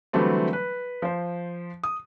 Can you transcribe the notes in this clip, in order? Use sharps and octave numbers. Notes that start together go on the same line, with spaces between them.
D3 E3 F#3 G3 A3 C4
B4
F3 C5
D#6